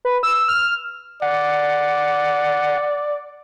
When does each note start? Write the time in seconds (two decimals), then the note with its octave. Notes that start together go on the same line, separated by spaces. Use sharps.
0.05 B4
0.23 E6
0.48 F6
1.22 D5 F#5